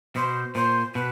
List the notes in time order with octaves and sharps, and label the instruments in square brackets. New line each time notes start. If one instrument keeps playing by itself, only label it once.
[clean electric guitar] B2 [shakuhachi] C5
[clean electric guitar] A#2 [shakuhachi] C5
[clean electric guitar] B2 [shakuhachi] B4